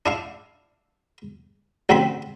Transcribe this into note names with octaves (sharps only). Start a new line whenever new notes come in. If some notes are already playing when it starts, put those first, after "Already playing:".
D4 E4 F5
A1 D2 D3 C4 B5